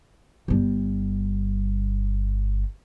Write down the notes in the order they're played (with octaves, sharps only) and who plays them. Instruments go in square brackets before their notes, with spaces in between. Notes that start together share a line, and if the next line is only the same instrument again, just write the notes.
[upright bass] G1 G3